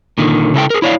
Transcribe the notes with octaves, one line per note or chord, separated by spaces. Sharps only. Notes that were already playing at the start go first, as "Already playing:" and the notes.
A#2 D3 D#3
C#3 E4 A4 G5
G#4 A#4
E4 C#5 D5 F5